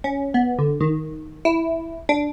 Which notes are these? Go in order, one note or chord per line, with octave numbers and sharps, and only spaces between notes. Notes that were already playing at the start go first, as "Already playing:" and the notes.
C#4
B3
D3
D#3
E4
D4